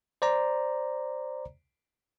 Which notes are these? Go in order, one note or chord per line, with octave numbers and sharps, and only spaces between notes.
C5 D5 A#5